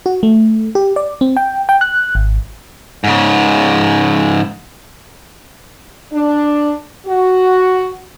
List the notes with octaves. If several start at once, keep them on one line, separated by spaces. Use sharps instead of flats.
F#4
A3
G4
D5
C4
G5
G5
F#6
G#1
G#2 C#3
D4
F#4